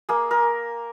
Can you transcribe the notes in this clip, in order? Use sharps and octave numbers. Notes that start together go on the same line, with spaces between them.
A#3 G#4
A#4